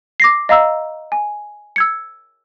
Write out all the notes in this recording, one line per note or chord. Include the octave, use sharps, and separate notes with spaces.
D6 A#6 C7
D#5 F5 A#5 E6
G#5
E6 G#6 C#7